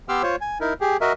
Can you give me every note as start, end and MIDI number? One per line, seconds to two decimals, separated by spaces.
0.09 0.22 59
0.09 0.22 67
0.09 0.22 84
0.09 0.22 86
0.09 0.22 88
0.09 0.22 89
0.23 0.36 65
0.23 0.36 72
0.23 0.36 73
0.41 0.58 80
0.61 0.73 63
0.61 0.73 64
0.61 0.73 70
0.81 0.97 67
0.81 0.97 68
1.01 1.13 66
1.01 1.13 70
1.01 1.13 75
1.01 1.13 76